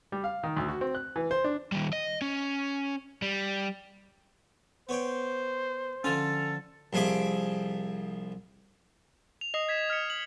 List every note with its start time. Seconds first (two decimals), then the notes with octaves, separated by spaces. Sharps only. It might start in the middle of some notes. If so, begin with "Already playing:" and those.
0.12 G3
0.24 F5
0.44 D#3
0.57 D2
0.68 F#4
0.81 C4
0.95 F#6
1.16 E3
1.31 C5
1.44 D4
1.72 D#3 G3
1.93 D#5
2.22 C#4
3.22 G3
4.89 B3 C5 C#5 G5
6.04 D3 F3 C#4 F4 A4
6.93 C2 F3 G#4 E5 D6
9.41 F7
9.54 D#5 D#6 C7 F7
9.69 G#6 B6 E7
9.90 F6 B6 C#7
10.10 F#7